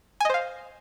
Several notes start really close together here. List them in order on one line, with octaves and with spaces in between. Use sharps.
G#5 D#5 C5 F5